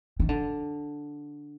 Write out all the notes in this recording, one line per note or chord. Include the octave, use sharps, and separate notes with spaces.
D#3
D3